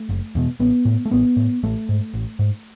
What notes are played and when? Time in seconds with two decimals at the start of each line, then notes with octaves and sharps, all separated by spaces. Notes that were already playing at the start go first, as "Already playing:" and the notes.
Already playing: A3
0.09 F#1
0.35 E2 B2
0.60 A1 B3
0.85 A2
1.05 A3
1.11 A1 B3
1.37 A2
1.63 A1 A3
1.89 G#2
2.14 A1
2.39 G#2